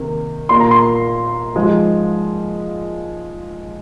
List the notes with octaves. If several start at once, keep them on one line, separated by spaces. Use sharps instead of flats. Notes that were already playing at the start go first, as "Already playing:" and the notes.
Already playing: C3 D#3 A#3
A#2 A#3 C6
A#5
C6
G#2 F3 G#3